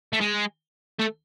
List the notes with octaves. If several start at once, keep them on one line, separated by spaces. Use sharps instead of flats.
A3
G#3
A3